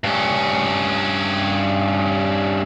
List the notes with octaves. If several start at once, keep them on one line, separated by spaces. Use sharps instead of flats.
G2 C#4